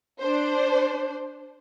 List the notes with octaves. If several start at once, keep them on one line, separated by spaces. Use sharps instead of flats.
D4 C5